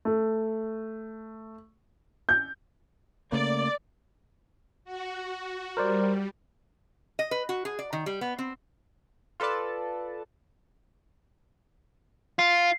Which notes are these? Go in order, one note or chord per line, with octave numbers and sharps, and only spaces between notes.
A3
G6
C#3 A3 A#3 D5
F#4
G3 A#4 C5 D5
D#5
B4
F#4
G#4
D5
D#3
G3
B3
C4
F4 A4 B4 D5 A5
F4 C7